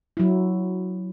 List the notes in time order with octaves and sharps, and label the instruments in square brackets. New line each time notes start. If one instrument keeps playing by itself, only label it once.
[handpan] F#3 E4